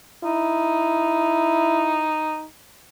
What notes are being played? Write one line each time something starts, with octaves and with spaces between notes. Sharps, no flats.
D#4 E4